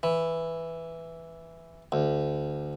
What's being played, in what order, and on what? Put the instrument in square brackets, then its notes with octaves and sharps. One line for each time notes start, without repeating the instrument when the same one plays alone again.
[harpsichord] E3
D2